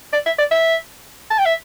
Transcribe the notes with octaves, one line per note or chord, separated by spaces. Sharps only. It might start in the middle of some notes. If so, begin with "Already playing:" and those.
D5
E5
D5
E5
A5
G5
E5